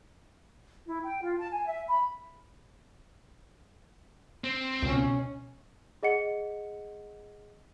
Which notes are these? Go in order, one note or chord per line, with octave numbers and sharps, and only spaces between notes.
E4
G5
F4
A5
G#5
E5
B5
C4
C#2 B2 C#4
G#4 D#5 F#5 C#7